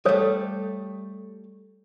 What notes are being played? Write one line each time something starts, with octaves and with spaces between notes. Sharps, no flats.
G3 A3 A4 C#5